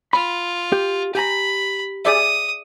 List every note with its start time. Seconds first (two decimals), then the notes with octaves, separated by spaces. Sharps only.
0.13 F4 B5
0.72 G4
1.15 G4 G#5 A#5 B5
2.05 G#4 D5 E5 D#6